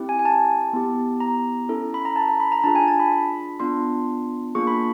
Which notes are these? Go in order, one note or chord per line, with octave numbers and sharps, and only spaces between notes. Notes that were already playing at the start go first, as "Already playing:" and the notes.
Already playing: C4 E4 G4
G#5
G#5
A5
B3 E4 G4
A#5
C#4 E4 A4
B5
A#5
A5
A#5
B5
A#5
D4 F4 G#4 A5
G#5
A5
B5
B5
B3 D4 F4 C6
A#3 D4 F4 G#4 C#6
B5